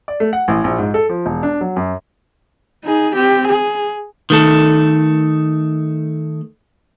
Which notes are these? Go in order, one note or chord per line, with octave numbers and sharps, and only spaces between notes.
D5
A3
F#5
A1
A#1
G#2
A4
F3
E1
D4
F#3
F#2
D#4 G#4
C4 G4
G#4
D#3 A3 A4